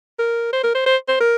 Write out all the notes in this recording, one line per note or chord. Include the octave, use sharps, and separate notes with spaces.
A#4
C5
A#4
C5
C5
C5
A#4